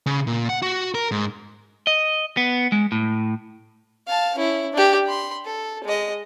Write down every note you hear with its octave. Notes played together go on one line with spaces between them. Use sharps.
C#3
A#2
F#5
F#4
A#4
G#2
D#5
B3
G#3
A2
F5 A5
C#4 E4
D4 G4
B5 C6
A4
G#3 D#5